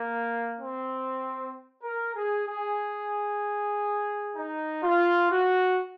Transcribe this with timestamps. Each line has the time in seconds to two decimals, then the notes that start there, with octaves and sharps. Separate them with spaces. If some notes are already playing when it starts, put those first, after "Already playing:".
Already playing: A#3
0.57 C4
1.83 A#4
2.15 G#4
2.46 G#4
4.36 D#4
4.83 F4
5.30 F#4